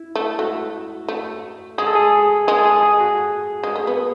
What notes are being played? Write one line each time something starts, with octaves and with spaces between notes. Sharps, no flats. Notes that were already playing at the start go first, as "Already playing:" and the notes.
Already playing: E4
A3
A3 F#4
A3
G#3 G#4
A4
G#4
G#3 G#4
A4
G#4
G#4
F#4
G#3
A3
B3